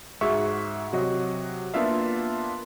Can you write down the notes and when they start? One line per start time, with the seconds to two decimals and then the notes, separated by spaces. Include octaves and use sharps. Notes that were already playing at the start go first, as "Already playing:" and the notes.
0.21 G#2 F#4 G#4 E5 C#6
0.93 C3 F#3 F#4 D#5
1.74 A#3 B3 D4 F4 E5 F5